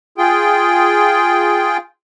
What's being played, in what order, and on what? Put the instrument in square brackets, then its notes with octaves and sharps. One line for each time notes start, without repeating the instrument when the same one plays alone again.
[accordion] F4 G#4 G5